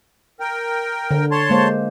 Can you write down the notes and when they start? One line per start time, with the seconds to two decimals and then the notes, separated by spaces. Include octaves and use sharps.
0.40 A#4 G5
1.11 D3
1.31 C#5 A5 C6
1.50 G#3 A#3 C5